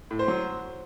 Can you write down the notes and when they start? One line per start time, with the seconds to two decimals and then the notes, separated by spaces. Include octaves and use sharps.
0.11 A2
0.19 C5
0.28 F#3